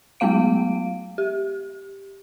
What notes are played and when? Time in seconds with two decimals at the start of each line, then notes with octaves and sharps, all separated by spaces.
0.20 F#3 G#3 A3 B3 F5 D7
1.18 G4